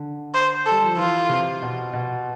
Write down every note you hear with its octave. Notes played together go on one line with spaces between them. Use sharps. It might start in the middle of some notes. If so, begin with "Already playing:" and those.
Already playing: D3
C5
A4
G3
F3
E3 F4
C3
B2
B2